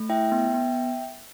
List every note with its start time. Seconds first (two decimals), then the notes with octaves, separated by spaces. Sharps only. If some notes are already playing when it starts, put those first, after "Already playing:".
Already playing: A3
0.09 E4 E5 G5
0.32 B3
0.54 B3